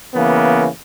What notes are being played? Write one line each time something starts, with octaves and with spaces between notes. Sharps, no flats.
C#3 E3 A#3 B3